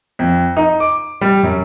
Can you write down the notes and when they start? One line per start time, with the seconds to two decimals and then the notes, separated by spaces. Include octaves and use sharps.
0.19 F2
0.57 D#4
0.80 D6
1.21 G3
1.43 F#2